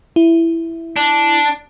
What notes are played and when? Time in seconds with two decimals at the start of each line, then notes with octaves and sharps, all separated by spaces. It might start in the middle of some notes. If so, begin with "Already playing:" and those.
0.16 E4
0.96 D4